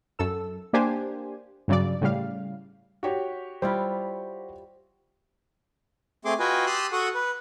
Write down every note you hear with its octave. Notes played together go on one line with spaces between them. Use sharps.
F#2 A4 E6
A#3 D4 G4 C5 G#5
G2 C#3 F#3 D5
A2 C#3 G3 F5
F#4 G4 C#5
G3 E4 F4 C5
A3 C4 G#4 C6 D6
F4 F#4 B4 D#5 G5 G#5
G4 A5 C6 D#6 E6 F#6
F#4 A4 F#5 C#6 D#6
B4